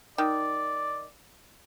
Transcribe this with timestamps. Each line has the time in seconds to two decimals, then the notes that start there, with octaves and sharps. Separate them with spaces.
0.18 D#3 D5